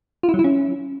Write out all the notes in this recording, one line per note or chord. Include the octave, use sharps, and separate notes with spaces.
F4
E4
F#3
E4
C#4